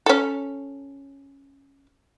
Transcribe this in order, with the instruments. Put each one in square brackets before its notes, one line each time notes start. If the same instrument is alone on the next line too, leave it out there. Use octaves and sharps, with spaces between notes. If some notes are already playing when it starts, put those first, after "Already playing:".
[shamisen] C#4 A4